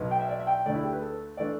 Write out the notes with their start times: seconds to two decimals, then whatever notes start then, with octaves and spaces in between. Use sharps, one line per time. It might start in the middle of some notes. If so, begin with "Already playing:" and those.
Already playing: B1 B2 B3
0.11 G5
0.20 E5
0.29 D5
0.39 E5
0.47 G5
0.66 D2 D3 A3 D4 D5
0.74 E4
0.84 G4
0.93 B4
1.01 A4
1.37 E3 A3 D4 D5